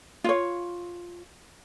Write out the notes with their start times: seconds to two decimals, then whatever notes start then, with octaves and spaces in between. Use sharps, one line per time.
0.24 F4 C#5